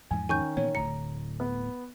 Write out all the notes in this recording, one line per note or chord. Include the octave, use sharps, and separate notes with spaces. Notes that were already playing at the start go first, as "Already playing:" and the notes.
E2 G#2 F3 G#5
D#3 C#4 G#5 C#6 G6
A#2 E3 B3 C#5
D1 A2 D3 A#5 C#7
B3